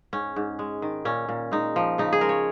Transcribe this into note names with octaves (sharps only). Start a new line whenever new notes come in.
G#2 C#4
G#2
G#3
D#3
A#2 C#4
A#2
G#3 D#4
F3
C#3 D#4
G#4
G#3 A#4
C#5